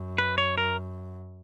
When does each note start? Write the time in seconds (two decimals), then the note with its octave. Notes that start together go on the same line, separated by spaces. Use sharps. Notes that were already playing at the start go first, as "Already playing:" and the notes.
Already playing: F#2
0.18 B4
0.38 C#5
0.58 A#4